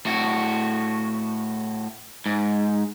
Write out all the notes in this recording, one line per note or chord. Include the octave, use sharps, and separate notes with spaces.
A2 F#4
G#2